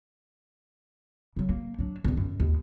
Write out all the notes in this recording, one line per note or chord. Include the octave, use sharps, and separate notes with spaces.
C#3 F#3
A#3
F#3 D4
E2 D#3
F#2
D#2